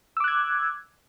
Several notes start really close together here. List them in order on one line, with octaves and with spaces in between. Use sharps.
E6 D6 F#6 G#6